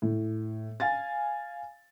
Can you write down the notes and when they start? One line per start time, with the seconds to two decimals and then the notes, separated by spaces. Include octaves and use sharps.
0.02 A2
0.80 F5 G#5 A6